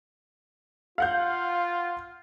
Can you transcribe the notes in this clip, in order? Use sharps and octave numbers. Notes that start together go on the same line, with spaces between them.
F4 F5 F#5 G6